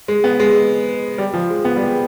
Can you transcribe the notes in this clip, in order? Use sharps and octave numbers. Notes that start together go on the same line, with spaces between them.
G#3
B3
G#3
G3
F3
G#3
B3
G3
G#3